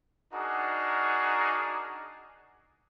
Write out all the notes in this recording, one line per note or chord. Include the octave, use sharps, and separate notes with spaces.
D4 D#4 F#4 G#4 A#4